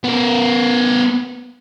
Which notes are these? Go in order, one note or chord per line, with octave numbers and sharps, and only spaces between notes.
B3 A#4